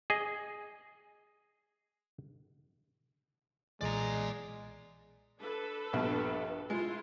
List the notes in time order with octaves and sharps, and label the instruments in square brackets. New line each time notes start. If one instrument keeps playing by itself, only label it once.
[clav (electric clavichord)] G#4 D#5
[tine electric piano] B1 A#2 E3 [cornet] G#3 [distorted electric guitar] D5 A#5
[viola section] D4 A4 B4
[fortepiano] A#1 G2 B2
[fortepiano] G#3 [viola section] E4 F4 C6